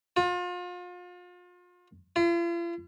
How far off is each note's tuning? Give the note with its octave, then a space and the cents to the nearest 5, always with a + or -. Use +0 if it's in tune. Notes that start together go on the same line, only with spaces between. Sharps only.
F4 +35
F4 -45